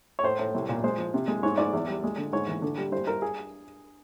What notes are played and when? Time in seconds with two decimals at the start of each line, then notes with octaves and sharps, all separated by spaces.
0.19 C#5
0.23 A2 C5
0.39 A2
0.54 C2
0.69 A#2
0.84 G#3 C5
0.98 F3
1.14 C3
1.28 G#3
1.43 G#2 C#5
1.58 G#2 D5
1.73 E2
1.88 G3
2.04 G#3
2.18 D3
2.33 G#2 C#5
2.47 E3
2.62 D3
2.77 G3
2.92 G2 C5
3.07 G2 A#4
3.22 G#4